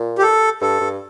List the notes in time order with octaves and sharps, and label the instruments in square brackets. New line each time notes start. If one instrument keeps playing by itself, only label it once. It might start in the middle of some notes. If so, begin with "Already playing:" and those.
Already playing: [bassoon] A#2
[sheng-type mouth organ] G4
A4
[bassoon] G2 [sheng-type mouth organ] A4
[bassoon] G2